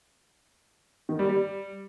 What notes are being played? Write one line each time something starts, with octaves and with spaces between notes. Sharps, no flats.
D#3
G3
G3